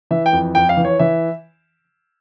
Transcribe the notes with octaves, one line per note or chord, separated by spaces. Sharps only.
E3 E5
G5
F2
F2 G5
F5
E3
C#5
E3 E5